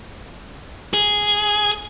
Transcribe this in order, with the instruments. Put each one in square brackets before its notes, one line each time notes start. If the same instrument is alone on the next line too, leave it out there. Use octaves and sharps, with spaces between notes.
[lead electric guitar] G#4